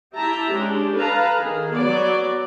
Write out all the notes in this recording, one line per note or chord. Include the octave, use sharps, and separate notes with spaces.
E4 G4 E5 A5 A#5
G#3 C#4 D4 G4
A4 B4 F5 A5 A#5
D#3 G#4
F#3 B3 D5